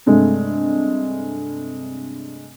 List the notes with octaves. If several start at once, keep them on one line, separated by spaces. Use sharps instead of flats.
G2 C3 G#3 A3